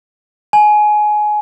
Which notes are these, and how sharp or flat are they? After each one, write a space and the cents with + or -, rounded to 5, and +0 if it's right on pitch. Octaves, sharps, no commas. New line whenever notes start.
G#5 +20